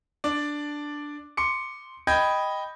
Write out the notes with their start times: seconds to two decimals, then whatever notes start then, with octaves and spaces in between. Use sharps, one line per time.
0.24 D4 D5
1.37 C6 D6 C#7
2.07 D#5 G5 B5 G6 G#6